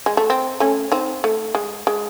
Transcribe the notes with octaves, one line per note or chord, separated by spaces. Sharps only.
G#3
A3
C4
A3 C#4
C4 D#4
A3
G#3
G#3